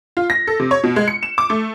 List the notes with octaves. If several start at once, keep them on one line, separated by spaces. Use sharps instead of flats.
F4
A#6
A4
C3
C#5
B2
G#3
C#7
E7
D6
A3